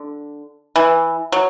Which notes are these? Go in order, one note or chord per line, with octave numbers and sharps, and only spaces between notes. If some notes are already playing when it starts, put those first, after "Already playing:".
Already playing: D3
E3
F#3